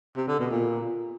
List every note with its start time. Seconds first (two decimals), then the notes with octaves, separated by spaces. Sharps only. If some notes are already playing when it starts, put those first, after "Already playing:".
0.16 C3
0.28 D3
0.39 B2
0.51 A#2